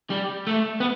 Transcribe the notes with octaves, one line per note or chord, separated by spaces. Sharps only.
G3
A3
B3